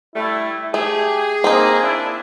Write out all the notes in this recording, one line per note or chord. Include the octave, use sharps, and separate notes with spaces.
D3 G3 A3 E4
A3 G4 G#4
A#3 C4 D#4
D4 E4